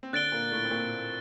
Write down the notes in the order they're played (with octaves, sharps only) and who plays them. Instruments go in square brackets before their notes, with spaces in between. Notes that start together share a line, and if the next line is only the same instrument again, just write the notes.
[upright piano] C4
[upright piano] D3 D4 [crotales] F#6 A6 D7 G7
[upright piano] A#2 A#3
A2 A3
C4
A#2 A#3